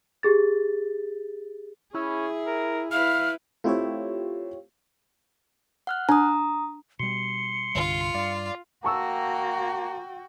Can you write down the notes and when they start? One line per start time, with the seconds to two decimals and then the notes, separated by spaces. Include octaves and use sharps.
0.23 G4 G#4 A6
1.94 C#4 E4 G#4
2.47 A#4
2.92 E4 B4 F5 F6
3.64 A3 C4 E4 F4 G4 C#5
5.87 F#5 F6 F#6
6.09 D4 A#5 D#6
7.00 B2 G3 C6 C#7
7.75 C2 G2 D3 F4
8.14 G2 D5 F5
8.84 A#3 F#4 G5 A5 C#6 E6